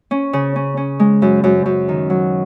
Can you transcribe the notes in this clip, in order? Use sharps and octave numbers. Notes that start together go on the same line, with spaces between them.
C#4
C#3
C#4
C#4
G#3
F#2
F#2
F#2
D#3
F#3